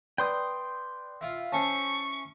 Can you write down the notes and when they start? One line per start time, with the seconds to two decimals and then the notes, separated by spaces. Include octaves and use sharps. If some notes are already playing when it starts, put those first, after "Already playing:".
0.18 B4 D5 G5 C6 D#6
1.21 E4 F4
1.52 C#4 E4 C5 A5 C#6